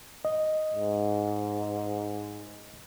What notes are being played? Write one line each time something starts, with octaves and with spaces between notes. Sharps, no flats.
D#5
G#2